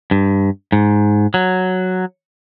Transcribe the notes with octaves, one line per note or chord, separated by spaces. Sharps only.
G2
G#2
F#3